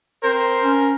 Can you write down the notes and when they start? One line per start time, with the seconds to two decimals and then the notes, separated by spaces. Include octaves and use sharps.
0.23 C4 A#4 C5
0.63 C#4